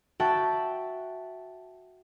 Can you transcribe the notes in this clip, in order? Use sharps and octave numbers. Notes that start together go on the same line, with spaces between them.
F#4 E5 G5 A5